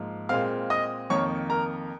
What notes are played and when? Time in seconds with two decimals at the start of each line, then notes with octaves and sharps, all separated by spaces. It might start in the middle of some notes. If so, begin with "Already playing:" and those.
Already playing: G#2 F3 A#3
0.29 A#2 G#3 C4 F5 F6
0.70 D#5 D#6
1.10 F2 D#3 A#3 C#5 C#6
1.50 A#4 A#5